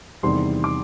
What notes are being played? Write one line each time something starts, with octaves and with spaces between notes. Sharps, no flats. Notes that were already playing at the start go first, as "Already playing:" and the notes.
E2 C3 D#3 G3 C6
D6